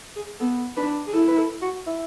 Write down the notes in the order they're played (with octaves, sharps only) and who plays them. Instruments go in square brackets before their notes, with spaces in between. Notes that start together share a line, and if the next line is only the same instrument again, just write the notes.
[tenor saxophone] G#4
[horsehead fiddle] B3 [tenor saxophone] A4
[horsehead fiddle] D4 [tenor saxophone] B4
[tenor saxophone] G#4
[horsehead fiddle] E4 [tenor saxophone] A4
[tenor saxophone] B4
A4
F#4
E4